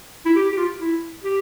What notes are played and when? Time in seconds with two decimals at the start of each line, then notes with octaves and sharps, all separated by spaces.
0.26 E4
0.36 G4
0.52 G4
0.58 F4
0.80 E4
1.24 G4